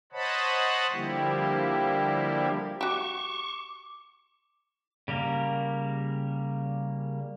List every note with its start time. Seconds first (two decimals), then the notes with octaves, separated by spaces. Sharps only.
0.12 C5 C#5 D#5 F#5 A5 B5
0.93 D3 F3 G3 A#3 E4 G4
2.81 F#4 G4 C#6 D6
5.08 C#3 G3 A#3 A#4